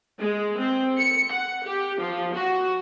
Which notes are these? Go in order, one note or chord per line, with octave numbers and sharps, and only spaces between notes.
G#3
C4
C#7
F#5
G4
F3
F#4